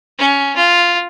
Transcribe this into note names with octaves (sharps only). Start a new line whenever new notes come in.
C#4
F4